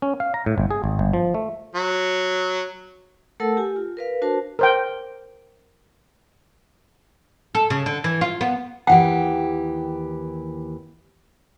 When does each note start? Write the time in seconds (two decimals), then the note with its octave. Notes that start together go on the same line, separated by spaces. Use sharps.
0.02 C#4
0.20 F5
0.34 A#5
0.46 A2
0.58 G1
0.71 G#4
0.84 G#1
0.99 G1
1.13 F3
1.34 A3
1.75 F#3
3.40 A3 A4 A#4 F#5 A5 E6
3.57 G4 G#5
3.76 F4
3.97 A#4 B4 F5
4.22 D4 F#4 A#4 C5 A5
4.59 A#4 C5 G5
7.55 A4
7.70 C#3
7.86 D3
8.04 E3
8.21 F4
8.41 B3
8.87 D#2 E3 G4 F#5 G5